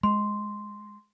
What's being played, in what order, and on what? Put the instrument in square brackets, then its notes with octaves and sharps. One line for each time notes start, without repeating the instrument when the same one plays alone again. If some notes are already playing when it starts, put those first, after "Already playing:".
[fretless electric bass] G#3 [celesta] C6